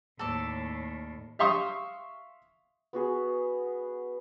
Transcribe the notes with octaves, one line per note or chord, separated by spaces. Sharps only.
D#2 A2 A4 D5
E5 F5 C6 C#6 D#6
B3 F#4 G#4